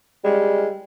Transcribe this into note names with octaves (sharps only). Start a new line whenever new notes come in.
G3 G#3